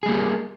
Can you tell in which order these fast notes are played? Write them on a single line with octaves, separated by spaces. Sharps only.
G#4 G3 A#3 G4 A#4